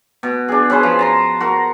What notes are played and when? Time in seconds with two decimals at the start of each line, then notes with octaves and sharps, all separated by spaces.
0.23 B2
0.48 D4 G#4
0.70 C#4 G#4 B4 C5
0.83 F3
0.99 A5 A#5 C6
1.40 F#4 A#4